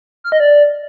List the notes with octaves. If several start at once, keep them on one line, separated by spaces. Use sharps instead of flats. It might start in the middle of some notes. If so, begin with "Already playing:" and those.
F6
D#5
D5